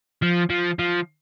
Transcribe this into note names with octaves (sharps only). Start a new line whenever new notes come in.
F3
F3
F3